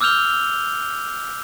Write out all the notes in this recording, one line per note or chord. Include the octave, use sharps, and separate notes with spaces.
D6 E6 F6 G6 F7 G7